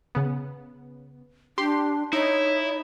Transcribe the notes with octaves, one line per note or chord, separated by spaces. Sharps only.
C#3 B3
D4 G4 C6
D#4 E4 C#5